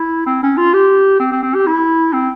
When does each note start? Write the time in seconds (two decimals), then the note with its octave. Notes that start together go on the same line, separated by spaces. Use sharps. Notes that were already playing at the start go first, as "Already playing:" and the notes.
Already playing: E4
0.27 C4
0.43 C#4
0.58 F4
0.74 G4
1.20 C4
1.32 C4
1.43 C4
1.55 G4
1.67 E4
2.13 C4